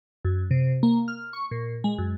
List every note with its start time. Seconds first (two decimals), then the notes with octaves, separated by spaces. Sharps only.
0.25 F#2
0.51 C3
0.83 A#3
1.08 F6
1.33 C#6
1.51 A#2
1.84 G#3
1.98 F#2